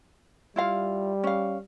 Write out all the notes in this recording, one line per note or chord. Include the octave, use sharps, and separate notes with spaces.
G3 E4 F4 F5
C#4 F5